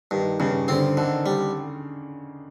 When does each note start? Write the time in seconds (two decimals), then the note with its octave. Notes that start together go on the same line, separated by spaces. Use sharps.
0.11 G2 D#3
0.40 G2 C#3
0.68 D3 C4
0.97 D3 D#3
1.26 G3